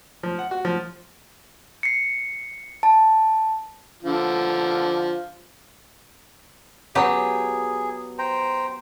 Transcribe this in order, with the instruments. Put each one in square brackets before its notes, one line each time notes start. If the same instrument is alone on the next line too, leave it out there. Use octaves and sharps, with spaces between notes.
[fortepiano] F3
F#5
F#4
F3
[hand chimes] C7 C#7
A5
[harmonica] D3 F3
[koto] F#3 B3 G4 [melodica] G#4
[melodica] C5 G5 A#5